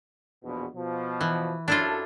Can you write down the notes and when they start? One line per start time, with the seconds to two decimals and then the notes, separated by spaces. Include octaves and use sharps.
0.43 A#1 E2 B2
0.74 B2 F3
1.21 E3
1.68 F#2 D4 E4 F4 A4